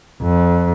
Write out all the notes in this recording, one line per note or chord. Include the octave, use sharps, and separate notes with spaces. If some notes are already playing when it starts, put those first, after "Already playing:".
F2